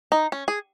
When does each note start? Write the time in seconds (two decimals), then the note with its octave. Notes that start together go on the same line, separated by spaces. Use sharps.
0.12 D#4
0.32 C#4
0.48 G#4